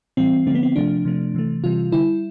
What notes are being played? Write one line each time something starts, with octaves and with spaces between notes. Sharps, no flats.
A2 E3 G3 C4
D3 F3 A3 C4
B3
C4
C3 F3 A3 D4
C3 F3 A3
C3 E3 A3
C3 E3 G3 F4
D3 G3 E4